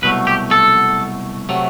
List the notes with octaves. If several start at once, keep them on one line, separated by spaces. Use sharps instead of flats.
C2 B2 F#3 A3 B4
G4
A4
C3 F#3 A3